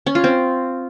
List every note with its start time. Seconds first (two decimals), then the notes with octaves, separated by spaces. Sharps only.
0.06 C#4
0.15 F4
0.24 C4